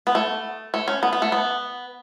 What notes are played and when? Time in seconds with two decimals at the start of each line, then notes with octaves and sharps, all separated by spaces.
0.07 B3
0.15 A3
0.74 A3
0.88 C#4
1.03 B3
1.13 B3
1.22 A3
1.32 B3